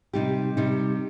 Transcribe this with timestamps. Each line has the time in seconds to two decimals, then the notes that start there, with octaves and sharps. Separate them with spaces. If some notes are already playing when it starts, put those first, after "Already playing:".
0.13 C3 G3 D#4 G4
0.57 C3 G3 D#4 G4